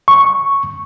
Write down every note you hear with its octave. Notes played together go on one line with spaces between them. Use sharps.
C#6